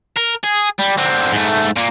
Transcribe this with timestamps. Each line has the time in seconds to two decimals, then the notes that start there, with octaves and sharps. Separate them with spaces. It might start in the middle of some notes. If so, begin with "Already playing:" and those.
0.17 A#4
0.44 G#4
0.79 G3
0.98 D3 C4
1.32 G#2 A3
1.76 A#2 A#3